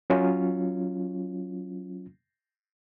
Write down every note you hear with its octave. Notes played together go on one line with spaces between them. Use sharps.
F#3 C#4 F4